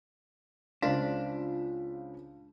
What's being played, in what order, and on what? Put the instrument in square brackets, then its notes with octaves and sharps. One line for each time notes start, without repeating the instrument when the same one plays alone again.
[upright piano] C#2 C5 B6 [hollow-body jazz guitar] D4 [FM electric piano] F4